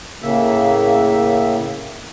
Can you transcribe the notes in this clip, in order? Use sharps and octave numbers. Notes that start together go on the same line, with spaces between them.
A2 C#3 A#3 E5